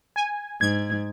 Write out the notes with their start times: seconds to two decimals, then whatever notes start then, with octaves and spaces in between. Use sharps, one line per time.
0.16 G#5
0.61 G#2 G#6